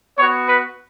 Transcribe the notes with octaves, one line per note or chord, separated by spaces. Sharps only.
B3 F#4 C#5
B4